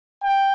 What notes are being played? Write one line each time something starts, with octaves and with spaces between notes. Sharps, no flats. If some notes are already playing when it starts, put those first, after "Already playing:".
G5